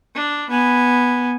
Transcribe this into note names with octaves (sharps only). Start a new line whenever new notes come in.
D4
B3 G#5